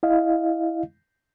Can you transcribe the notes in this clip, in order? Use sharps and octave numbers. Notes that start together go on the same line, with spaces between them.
E4 D#5 F5